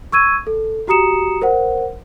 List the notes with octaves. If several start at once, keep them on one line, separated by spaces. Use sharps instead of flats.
C#6 E6 G#6 D#7
A4
F#4 G4 A#5 D#6 C#7 E7
A#4 C5 F#5